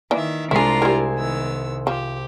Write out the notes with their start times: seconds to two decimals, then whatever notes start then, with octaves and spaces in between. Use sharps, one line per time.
0.11 D#3 E3 A#3 D5 E5
0.51 C2 G#3 D4 E4 F4 G#4 A#5 C7
0.82 G3 E4 A#4 G#5 G#6
1.13 D#3 B3 E6
1.87 F3 G4